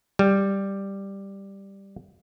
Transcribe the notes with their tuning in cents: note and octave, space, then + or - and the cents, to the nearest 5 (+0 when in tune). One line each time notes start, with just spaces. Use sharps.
G3 +5